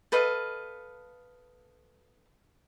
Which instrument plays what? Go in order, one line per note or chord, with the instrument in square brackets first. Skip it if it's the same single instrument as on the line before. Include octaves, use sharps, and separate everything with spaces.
[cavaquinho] A4 B4 D#5 F5